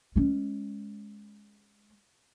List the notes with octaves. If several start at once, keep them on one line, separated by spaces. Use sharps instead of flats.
G#3 C#4